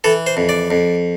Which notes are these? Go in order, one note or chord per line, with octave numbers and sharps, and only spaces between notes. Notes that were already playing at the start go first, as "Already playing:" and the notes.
E3 A4
C5
F2
D5
F2